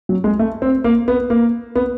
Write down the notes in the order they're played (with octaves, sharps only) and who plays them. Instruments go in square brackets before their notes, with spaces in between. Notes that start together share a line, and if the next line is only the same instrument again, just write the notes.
[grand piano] F#3
G#3
A3
C4
A#3
B3
A#3
B3